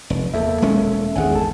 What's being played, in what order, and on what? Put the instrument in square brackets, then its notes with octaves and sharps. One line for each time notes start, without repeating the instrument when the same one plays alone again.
[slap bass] F1
[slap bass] E2 [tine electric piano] A#3 A4 E5
[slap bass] E1 G#3 C#4
[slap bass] G#1 E2 D#3 [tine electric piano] G#4 F#5 G#5
[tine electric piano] G1 A4 A5